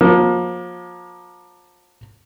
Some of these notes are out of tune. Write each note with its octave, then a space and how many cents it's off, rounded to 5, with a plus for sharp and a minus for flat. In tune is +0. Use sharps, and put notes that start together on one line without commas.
F3 +35 A#3 +30